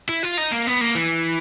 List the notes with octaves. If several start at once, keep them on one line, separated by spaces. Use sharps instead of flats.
E4
F4
D#4
A#3
B3
A#3
E3